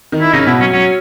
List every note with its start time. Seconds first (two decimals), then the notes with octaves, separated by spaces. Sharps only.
0.12 D#3 D#4
0.21 E4
0.33 C#3 C#4 D#4
0.46 B2 B3 E4
0.60 F#3 C#4
0.73 F#3 C#4